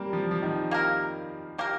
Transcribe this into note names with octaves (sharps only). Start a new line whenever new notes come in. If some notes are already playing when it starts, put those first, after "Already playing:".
Already playing: G3 A#3 C4
F3
F3
D#3
A#3 G4 A#4
A#3 G4 A#4